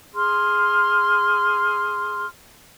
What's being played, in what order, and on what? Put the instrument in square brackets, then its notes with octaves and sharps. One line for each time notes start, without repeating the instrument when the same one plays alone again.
[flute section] G#4 C6 F6